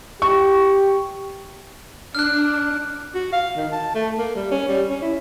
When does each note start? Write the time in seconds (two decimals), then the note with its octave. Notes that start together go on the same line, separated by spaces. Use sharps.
0.22 G4 C#6
2.15 D4 F6 F#6
3.15 F#4
3.33 F5
3.57 D#3
3.72 A5
3.95 A3
4.18 A#3
4.35 G3
4.51 C#4
4.69 G3
4.89 C#4
5.02 E4